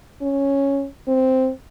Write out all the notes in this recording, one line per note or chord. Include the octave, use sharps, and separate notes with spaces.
C#4
C4